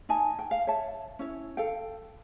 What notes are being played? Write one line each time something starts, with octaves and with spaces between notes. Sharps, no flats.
D#4 G#5 A5
G5
F5
C#5 E5 A5
C#4 E4 C#5
A4 F5 G5